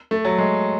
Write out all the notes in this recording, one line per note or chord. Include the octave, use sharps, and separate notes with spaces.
A3
F#3
G#3